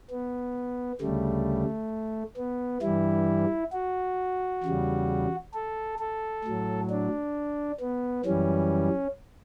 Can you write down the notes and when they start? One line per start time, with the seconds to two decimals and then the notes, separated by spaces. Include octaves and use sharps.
0.10 B3
1.01 D2 C#3 G3 A3
2.37 B3
2.82 G2 E3 G3 E4
3.73 F#4
4.63 E2 C#3 G3
5.54 A4
5.99 A4
6.44 A2 F#3
6.90 D4
7.80 B3
8.25 F#2 E3 G3 C#4